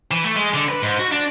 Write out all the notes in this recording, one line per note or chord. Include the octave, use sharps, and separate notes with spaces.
E3
A3
G#3
D3
B4
G#2
F#4
D4